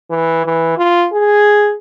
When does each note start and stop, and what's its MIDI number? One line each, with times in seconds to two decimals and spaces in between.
0.10 0.43 52
0.46 0.74 52
0.78 1.07 65
1.13 1.74 68